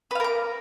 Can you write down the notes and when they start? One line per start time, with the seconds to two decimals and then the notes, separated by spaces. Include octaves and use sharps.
0.11 B4
0.15 F5
0.20 A#4
0.24 D6